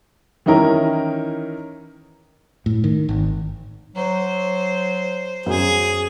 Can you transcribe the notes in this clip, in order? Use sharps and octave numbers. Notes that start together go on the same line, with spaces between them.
D#3 E3 C#4 D#4 E4 A#4
A2
D#3
G#1
F#3 C5
F#2 G#4